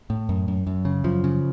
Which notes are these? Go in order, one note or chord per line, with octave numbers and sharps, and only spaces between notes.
A2
F#2
F#2
F#2
C#3
F#2 F3
C#3